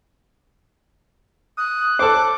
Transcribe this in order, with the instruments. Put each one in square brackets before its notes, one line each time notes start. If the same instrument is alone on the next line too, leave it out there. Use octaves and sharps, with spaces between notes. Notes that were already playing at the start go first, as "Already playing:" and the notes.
[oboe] D#6 [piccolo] F#6
[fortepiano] A4 C5 [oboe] D6